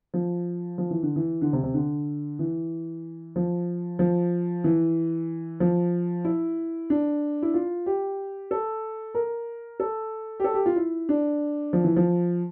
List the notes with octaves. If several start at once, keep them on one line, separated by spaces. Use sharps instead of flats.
F3
F3
E3
D3
E3
D3
C3
C3
D3
E3
F3
F3
E3
F3
E4
D4
E4
F4
G4
A4
A#4
A4
G4
A4
G4
F4
E4
D4
F3
E3
F3